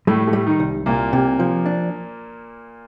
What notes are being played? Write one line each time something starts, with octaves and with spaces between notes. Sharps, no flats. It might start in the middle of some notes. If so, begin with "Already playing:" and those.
A2 G3 A3
A2 A3
G3
D#3 D#4
C2
C2 A#2 A#3
C3
F3
D4